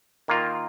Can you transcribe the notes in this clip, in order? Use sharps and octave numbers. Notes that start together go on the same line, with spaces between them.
D#3 A#3 F4